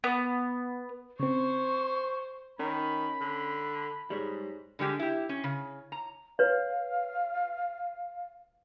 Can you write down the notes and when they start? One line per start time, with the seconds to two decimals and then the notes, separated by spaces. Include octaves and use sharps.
0.04 B3
1.19 C#3 C4 C5 C#6
2.59 D#3 C#4 B5
3.21 D3
4.10 G#2 G3 G#3 C#5
4.79 D3 G3 G#3 G4
4.99 E4 G4
5.29 C#4
5.44 C#3
5.92 A#5
6.39 B4 C#5 F5